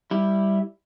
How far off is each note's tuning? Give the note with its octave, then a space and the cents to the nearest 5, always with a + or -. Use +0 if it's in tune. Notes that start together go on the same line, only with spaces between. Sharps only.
G3 +0 E4 +0